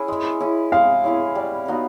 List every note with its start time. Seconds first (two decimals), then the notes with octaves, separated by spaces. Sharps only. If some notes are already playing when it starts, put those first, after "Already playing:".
Already playing: C#4 E4 G#4
0.08 G#3
0.40 C#4 E4 G#4
0.72 G#3 F5
1.04 C#4 E4 G#4
1.35 G3
1.68 B3 D#4 F#4